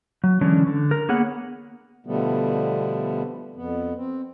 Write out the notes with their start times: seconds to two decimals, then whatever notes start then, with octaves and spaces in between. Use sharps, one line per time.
0.24 F#3
0.41 D3 E3 G#3 C#4 D4
0.67 D3
0.91 A#4
1.09 A#3 B3 G#4 C#5 F#5
2.06 B2 D3 F3 G3 A3 B3
3.56 F2 B3
3.96 C4